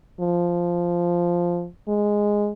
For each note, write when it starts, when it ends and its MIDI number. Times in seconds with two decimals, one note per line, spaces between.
0.20 1.67 53
1.88 2.51 56